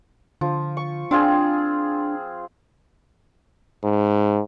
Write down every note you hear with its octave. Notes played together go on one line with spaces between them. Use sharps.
D3 F3
C#6
C4 D4 F4 G#4
G#2